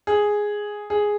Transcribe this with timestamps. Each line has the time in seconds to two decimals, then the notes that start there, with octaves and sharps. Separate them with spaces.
0.07 G#4
0.90 G#4